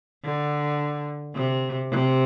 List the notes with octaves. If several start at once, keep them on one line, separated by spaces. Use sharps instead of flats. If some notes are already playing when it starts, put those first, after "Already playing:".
D3
C3
C3